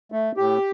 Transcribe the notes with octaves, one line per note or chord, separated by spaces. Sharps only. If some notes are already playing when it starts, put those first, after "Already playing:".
A3
A2 G4